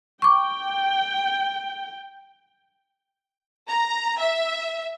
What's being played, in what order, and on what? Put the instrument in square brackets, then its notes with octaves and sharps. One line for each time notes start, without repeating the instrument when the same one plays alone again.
[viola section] G5 [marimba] C#6 D6
[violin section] A#5
E5